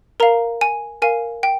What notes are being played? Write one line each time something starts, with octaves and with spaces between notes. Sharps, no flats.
A#4 F5 A#5
G#5
A#4 F5 G#5
G5